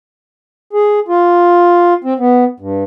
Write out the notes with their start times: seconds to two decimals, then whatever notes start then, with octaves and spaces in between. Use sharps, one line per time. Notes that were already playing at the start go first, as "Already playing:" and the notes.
0.73 G#4
1.08 F4
2.04 C4
2.19 B3
2.60 G2